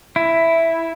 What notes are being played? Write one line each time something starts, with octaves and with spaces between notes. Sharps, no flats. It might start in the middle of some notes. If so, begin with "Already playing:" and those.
E4